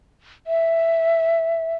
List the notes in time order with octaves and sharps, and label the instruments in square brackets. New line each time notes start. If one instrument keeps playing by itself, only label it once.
[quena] E5